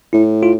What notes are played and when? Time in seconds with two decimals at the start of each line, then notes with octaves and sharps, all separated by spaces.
0.13 A2 E4
0.43 F4